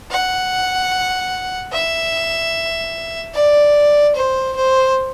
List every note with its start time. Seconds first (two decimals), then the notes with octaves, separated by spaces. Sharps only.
0.11 F#5
1.72 E5
3.34 D5
4.15 C5
4.55 C5